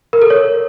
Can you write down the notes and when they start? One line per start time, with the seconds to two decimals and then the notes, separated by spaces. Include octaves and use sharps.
0.13 A#4
0.22 A4
0.30 C#5